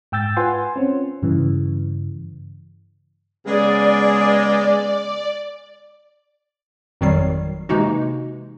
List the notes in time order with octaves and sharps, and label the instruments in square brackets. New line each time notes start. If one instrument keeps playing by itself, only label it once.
[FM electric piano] G#2 G5 E6 G6 A6
F4 B4 F#5 G#5 C6
C4 C#4
G2 C#3 E3
[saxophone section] C#3 B3 G#4 [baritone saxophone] G#3 [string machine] D5
[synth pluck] G#1 F2 D#3 F#3 G3 C7
C3 E3 G#3 A#3 D#4 F#4